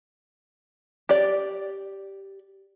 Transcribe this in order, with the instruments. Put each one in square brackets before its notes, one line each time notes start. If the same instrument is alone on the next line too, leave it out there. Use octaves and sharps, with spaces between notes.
[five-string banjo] G4 D5